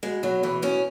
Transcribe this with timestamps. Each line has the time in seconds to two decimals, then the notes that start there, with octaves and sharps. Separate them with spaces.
0.03 B2 G#3
0.23 B2 F#3
0.43 B2 E3
0.62 B2 C#4